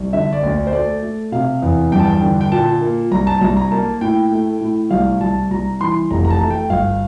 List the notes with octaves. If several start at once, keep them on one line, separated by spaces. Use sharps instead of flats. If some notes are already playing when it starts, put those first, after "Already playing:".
Already playing: C2
D3 E5
D5
D2
D5
C5
A3 D5
A3
C3 F5
E2
G2 G5
A5
G5
D3
G5
A#2 A5
A#3
C2 A#5
A5
C2 A#5
A#5
A#3 A5
A2 G5
A3
A2
C2 F5
C2 A5
C2 A#5
E3 C6
F1 A#5
A#5
A5
A3
G5
G1 F5